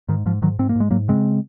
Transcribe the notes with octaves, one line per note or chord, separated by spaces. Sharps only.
G#2 D#3
G#2 F3
G#2 D#3 F#3
G#2 C4
A#3
G#2 G#3
G#2 F#3 A#3
C#3 G#3 C4